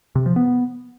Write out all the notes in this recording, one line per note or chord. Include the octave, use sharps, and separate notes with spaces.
C3
F3
B3